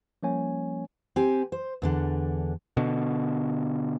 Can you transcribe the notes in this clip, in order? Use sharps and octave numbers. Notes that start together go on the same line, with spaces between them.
F3 G3 A#3 C#4 C#5 G#5
C4 G4 G#5
C5
E2 D3 D4
B2 D3